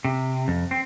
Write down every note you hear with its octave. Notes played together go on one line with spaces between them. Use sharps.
C3
F2
C4